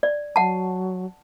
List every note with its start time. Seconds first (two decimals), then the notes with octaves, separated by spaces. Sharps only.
0.03 D5
0.36 F#3 F#5 A5